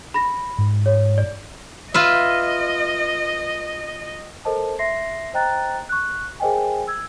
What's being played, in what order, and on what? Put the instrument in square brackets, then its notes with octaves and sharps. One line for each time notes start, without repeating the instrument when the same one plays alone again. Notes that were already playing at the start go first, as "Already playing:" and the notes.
[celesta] B5 A#6
[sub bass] G#2
[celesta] C#5
D5
[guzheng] F4 B4 E5 [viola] D#5
[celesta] A4 A#4 C5 D#5 A5
E5 C6 A#6 C7
C5 D#5 G5 A#5 F#6 A6
C#6 F#6
G#4 A#4 C5 D#5 G5 G#5
E6 G#6